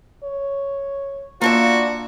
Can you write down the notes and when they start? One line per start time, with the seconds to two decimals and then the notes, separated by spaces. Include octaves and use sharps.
0.24 C#5
1.41 A#3 D4 F4 F#4 E5